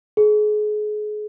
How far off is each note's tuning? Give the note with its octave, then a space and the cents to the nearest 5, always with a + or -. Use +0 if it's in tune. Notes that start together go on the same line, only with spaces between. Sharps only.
G#4 +30